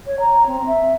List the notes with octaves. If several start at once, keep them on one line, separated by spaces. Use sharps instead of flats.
C#5
A#5
C4
E5